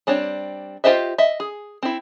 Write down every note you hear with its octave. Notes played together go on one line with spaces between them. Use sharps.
G3 C4 D4 C#5
F4 G4 C5 D#5 E5
D#5 E5
G#4
C4 E4